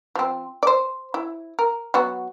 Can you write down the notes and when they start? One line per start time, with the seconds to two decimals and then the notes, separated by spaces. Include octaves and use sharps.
0.16 F3 C4
0.63 C5 D5
1.14 E4
1.59 A#4
1.94 F#3 B3 F#4